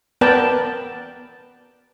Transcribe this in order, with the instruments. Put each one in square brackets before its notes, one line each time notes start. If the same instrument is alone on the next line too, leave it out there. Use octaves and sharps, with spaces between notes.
[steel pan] B3 A#4 B4 D5 G5 A5